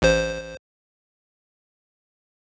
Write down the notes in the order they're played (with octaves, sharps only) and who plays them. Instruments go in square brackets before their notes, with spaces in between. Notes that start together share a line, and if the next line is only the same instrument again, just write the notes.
[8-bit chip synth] A1 C5